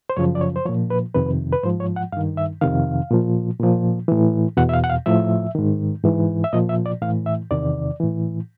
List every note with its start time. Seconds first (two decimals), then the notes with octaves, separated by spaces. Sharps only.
0.10 C5
0.17 F#2 C#3 F3 C#5
0.35 D5
0.41 C#5
0.56 C5
0.66 F3 C#5
0.69 A#2
0.90 B4
1.15 F2 C3 D#3 B4
1.52 B4
1.63 G#2 F3 C5
1.80 C#5
1.96 F#5
2.12 G2 D#3 F5
2.37 E5
2.61 F2 C3 D#3 F5
3.10 A#2 F3
3.59 A#2 F3
4.08 A2 E3
4.57 E2 B2 F#5
4.69 E5
4.74 F5
4.84 F#5
4.90 F5
5.06 A2 F3 E5
5.55 G#2 D#3
6.04 G#2 E3
6.44 E5
6.53 A#2 F3 D#5
6.69 E5
6.86 D5
7.02 A2 E3 F5
7.26 E5
7.51 E2 C3 D#3 D5
8.00 A2 E3